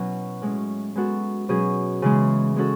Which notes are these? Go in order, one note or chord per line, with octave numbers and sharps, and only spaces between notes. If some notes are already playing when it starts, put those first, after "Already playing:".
Already playing: B2 F#3 C#4 E4 F#4
A2 G#3 C#4
G#3 B3 F#4 A4
B2 F#3 C#4 G#4
C#3 E3 G#3 B3
G#3 C#4 F#4 A4